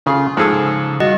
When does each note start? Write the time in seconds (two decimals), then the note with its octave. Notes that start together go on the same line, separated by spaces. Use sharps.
0.07 C#3 F4 G#4
0.37 G#2 F3 G#4 A4 G5 E6
0.52 C#3
1.00 G3 F#4 D#5 F5